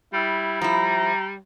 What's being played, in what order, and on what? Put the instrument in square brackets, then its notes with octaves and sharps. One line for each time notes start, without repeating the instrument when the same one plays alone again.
[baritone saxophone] G3 [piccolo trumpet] E4
[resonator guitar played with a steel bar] F3 E4 [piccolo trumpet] A#5